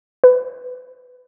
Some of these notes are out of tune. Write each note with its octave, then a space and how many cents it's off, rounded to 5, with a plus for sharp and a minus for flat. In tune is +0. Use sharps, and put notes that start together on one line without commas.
B4 +20